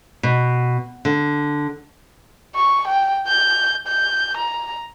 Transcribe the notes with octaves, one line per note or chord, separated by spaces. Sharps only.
B2
D3
C#6
G5
G6
G6
A#5